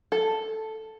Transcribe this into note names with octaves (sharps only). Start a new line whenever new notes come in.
A4